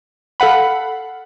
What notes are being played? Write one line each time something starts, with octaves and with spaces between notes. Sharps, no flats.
A4 F5 F#5 B5